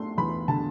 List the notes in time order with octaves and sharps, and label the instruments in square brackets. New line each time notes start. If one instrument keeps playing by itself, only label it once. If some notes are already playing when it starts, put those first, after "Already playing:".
Already playing: [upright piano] A3 D4 C6
E2 B5
D3 A5